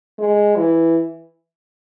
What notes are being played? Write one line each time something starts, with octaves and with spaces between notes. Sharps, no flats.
G#3
E3